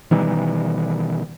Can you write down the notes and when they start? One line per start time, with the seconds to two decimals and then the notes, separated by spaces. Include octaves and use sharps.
0.11 B2 D#3 E3 G3